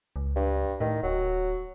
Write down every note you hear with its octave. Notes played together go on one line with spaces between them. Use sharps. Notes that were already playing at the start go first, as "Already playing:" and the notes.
C#2
G2
A2 D#3
D1 F#3